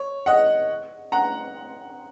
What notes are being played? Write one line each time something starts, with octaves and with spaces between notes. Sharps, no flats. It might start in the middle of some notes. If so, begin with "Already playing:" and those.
Already playing: C#5
D#5 F#5
F#5 A#5